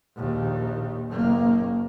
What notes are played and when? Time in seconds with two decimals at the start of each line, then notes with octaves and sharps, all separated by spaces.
0.15 A#1 D#2
1.10 F#1 A#3